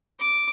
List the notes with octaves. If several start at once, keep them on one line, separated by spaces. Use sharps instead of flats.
D6